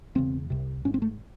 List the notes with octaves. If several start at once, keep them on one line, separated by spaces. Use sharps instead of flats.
E1 E2 C#3 C4
C2 C3
G#1 G#2 C#4
C4
A3